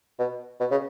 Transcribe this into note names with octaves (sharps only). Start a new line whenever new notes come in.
B2
B2
C#3